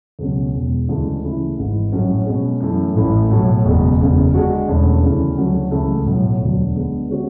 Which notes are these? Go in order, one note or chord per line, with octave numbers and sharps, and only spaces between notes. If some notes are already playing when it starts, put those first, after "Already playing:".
C#2 B2 F#3 C#4
E1 E2 B2
D2 C#3 E3 G#3
C#3 E3 A3 E4
G#1 G#2 E3
A2 F#3 C#4
B2 G#3 C#4
F#2 E3 A3
A1 A2 E3 A3 E4
B1 A2 F#3 A3
F#1 E2 B2 G#3
F#1 E2 C#3
D3 G#3 D4 F#4
E1 E2 D3 A3 C#4
D2 C#3 E3
D2 C#3 F#3
C#2 C#3 E3 A3 E4
B1 A2 F#3
E1 D2 D3 F#3
D3 G#3 B3
D3 G#3 C#4 F#4 C#5